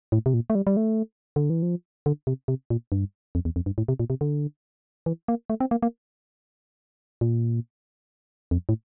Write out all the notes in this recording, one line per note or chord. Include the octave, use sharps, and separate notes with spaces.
A2
C3
A#2
A3
G3
G3
A3
D3
E3
F3
D3
C3
C3
A#2
G2
F2
E2
F2
G2
A2
C3
A#2
C3
D3
E3
A#3
A3
C4
A#3
A#3
A#2
F2
A2